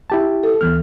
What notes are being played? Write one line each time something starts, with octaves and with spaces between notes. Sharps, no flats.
E4 G4 A5
A4
D2 E3 B3 F6